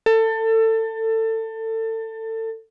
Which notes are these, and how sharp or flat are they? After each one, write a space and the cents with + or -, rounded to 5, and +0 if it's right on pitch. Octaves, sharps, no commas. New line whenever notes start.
A4 +25